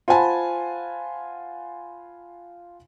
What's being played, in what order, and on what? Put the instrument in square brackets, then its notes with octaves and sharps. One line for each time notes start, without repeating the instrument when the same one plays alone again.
[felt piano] F4 C5 F#5 G#5 A5 B5